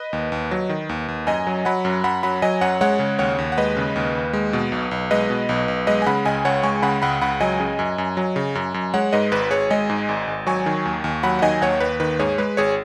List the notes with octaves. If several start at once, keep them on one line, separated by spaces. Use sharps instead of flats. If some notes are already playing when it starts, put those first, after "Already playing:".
Already playing: B4 D#5
D#2
D#2
F#3
D#3
D#2
D#2
F#2 D#5 G#5
F#3
F#3 F#5 B5
F#2
F#2 F#5 B5
F#3 F#5 B5
F#3 D#5 G#5
F#2 C#5 F#5
G#3 C#5 F#5
C#3
D#2 C#5 F#5
D#2
F#5
G#3 B4 D#5
C#3
D#2
D#2
G#3
B2
B1
B1
G#3 B4 D#5
B2
B1
B1
G#3 B4 D#5
G#5
C#3 F#5 B5
C#2 D#5 G#5
C#2 C#5 F#5
G#3 G#5 C#6
C#3 F#5 B5
C#2 F#5 B5
C#2 F#5 B5
F#3 D#5 G#5
C#3
F#2
F#2
F#3
C#3
F#2
F#2
G#3 C#5 F#5
G#2 B4 D#5
G#1 B4
G#1 G#4 C#5
G#3 D#5 G#5
G#2
G#1
G#1
F#3 G#5 C#6
D#3
D#2
D#2
F#3 F#5 B5
F#5
D#3 D#5 G#5
D#2 C#5 F#5
D#2 B4
D#3 B4
G#2 G#4 C#5
G#3 B4
G#1 G#4 C#5